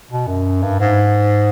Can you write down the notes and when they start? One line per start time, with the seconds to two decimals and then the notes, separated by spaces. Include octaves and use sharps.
0.11 B2
0.27 F#2
0.63 G2
0.80 G#2